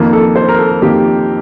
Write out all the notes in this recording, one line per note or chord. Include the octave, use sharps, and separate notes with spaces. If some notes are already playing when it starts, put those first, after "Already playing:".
Already playing: F2 D#3 A#3
A4
C5
A#4
A4
F2 D#3 A#3 G4